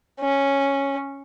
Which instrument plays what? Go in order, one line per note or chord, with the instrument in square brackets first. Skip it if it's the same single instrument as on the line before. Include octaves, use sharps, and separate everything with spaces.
[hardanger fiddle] C#4